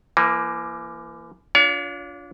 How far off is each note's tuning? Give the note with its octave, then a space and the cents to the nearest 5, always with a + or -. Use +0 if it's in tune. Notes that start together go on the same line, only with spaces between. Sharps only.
E3 +35 A#3 +5
D4 -20 F4 +15 C#5 +40